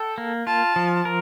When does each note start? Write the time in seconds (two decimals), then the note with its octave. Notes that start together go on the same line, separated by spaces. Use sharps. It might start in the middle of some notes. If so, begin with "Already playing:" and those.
Already playing: A4 G5
0.18 A#3
0.47 F4 A5
0.76 F3
1.05 A#4